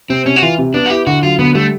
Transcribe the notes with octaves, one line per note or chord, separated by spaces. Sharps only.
C3 C4
C3 C#4
F#4
E3 F4
C3
B3 D4
F#4
E4 G4
D3 F#4
F#3 F4
D3 B3
G3 A3